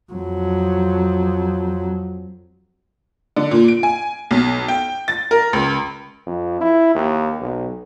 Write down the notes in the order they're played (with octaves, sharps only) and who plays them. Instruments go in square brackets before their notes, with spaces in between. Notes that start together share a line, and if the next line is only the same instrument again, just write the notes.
[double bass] F2 F#3
[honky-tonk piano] D3
A#2
D7
G#5
B1
G5
A6
A#4
C#2
[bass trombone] F2
E4
D#2
B1